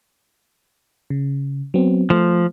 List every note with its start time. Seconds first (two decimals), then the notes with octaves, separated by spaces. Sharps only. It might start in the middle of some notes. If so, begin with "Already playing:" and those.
1.10 C#3
1.74 F#3 B3 C4
2.10 F3 A3